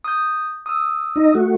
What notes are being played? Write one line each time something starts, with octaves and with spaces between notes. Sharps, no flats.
D#6 G6
D#6 E6
D#4 D#5
A3 F#4